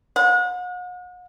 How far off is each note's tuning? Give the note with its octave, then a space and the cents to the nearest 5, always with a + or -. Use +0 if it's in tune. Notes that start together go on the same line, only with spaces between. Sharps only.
F#5 -40